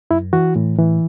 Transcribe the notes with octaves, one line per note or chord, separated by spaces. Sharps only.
F#2 E4
E3 F#4
A2
E3